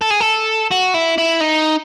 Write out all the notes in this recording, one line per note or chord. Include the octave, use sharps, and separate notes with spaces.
A4
G#4
A4
F#4
E4
E4
D#4